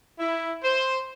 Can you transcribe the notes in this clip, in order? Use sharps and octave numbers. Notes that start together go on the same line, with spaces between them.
E4
C5